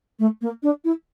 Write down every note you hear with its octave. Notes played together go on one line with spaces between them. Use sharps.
A3
A#3
D4
E4